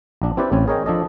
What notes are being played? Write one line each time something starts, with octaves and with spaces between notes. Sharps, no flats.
A#1 D4
C4 E4 G4 B4 D5
A1 C4 C#4 G#5
G#4 A#4 C#5 D#5 G5
F3 D4 A4 D#5